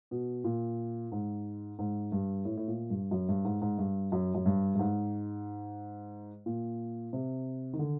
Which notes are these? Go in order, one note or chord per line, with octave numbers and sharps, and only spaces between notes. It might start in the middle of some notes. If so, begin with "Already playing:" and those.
B2
A#2
G#2
G#2
G2
A2
A2
A#2
G2
F#2
G2
G#2
G#2
G2
F#2
F#2
G2
G2
G#2
A#2
C3
D#3
D3